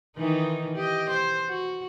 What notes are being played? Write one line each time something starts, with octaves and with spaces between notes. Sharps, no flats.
D#3 E3 D#4
G4 D#5
C5
F#4